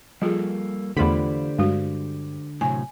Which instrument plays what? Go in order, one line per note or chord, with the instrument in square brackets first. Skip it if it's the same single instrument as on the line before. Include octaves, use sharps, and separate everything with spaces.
[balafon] F3 F4 G#4 [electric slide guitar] G3 A#3 A4
[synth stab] E2 F4 B5 [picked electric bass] D3 [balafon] A3 [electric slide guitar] G4 C5 D5
[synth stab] G2 [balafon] G#3 F#4
[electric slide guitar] A2 C3 F#3 [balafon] G#5